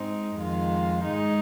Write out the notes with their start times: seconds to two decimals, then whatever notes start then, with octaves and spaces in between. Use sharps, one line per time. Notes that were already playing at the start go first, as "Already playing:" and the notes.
Already playing: G#2 G#3 C4 D#4
0.36 F2 D#3 G#3 F4
1.04 G#2 G#3 D#4